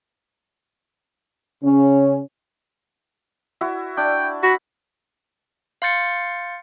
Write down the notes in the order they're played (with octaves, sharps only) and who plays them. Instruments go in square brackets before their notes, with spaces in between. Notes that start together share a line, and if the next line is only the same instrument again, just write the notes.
[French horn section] C#3 C#4
[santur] E4 F#4 E5
[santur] D4 [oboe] G5
[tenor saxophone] F#4 [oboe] B5
[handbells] F5 C6 G6 A6 C#7